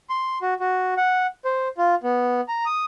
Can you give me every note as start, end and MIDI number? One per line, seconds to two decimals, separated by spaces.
0.10 0.39 84
0.42 0.54 66
0.60 0.94 66
0.97 1.27 78
1.45 1.68 72
1.78 1.95 65
2.03 2.41 59
2.48 2.65 82
2.66 2.85 87